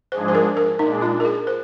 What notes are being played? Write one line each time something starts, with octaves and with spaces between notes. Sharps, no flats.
G#2 F3 G#3 D4 G#4 C5
C5
A#4
A#4
A#2 G#3 D4 D#4
F4
A#4
G#4
C5